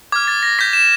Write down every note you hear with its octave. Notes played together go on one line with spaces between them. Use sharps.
D6 F6 G#6
A6
A#6
D6 G6 B6
E7